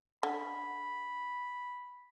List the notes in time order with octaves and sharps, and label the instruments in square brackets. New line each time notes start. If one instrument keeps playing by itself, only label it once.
[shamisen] D3 [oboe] B5